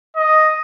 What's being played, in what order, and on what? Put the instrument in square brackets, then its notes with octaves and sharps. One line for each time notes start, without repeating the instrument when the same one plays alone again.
[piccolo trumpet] D#5